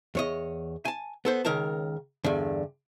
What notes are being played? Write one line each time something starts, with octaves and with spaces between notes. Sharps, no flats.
E2 C#5 D#5
G#5 A5
B3 A4 C5
C#2 D#3 A#4 C#5 A5
E2 G2 D3